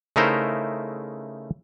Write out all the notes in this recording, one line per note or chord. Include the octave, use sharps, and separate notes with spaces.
C#3 A3 D#4 E4 A#4 C5